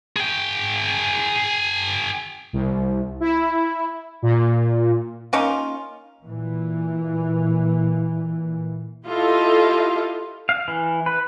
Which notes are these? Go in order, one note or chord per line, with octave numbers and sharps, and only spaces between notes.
G#4 G5
C2
E4
A#2
A#3 C#4 D#4 F4
A#2 E3
E4 F4 G4 A4 D#5 F5
F5
E3
B4